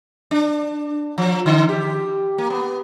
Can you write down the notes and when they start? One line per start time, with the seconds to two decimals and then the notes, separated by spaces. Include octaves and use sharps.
0.31 D4
1.18 F3
1.46 D3
1.69 G4
2.38 A#3
2.50 B3